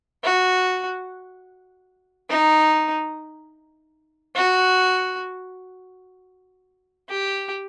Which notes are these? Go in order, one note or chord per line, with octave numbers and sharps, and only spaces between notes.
F#4
D#4
F#4
G4